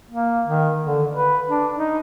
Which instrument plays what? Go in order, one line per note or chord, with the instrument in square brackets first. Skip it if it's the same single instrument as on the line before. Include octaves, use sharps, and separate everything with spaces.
[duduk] A#3
D#3
D3
B4
D4
D#4